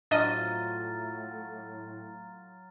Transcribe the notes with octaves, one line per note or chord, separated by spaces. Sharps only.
A2 F#3 D4 F4 C5 D#5 F6 A6